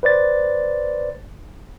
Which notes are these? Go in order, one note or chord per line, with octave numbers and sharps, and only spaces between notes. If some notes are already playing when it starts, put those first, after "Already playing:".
B4 C5 D5 A6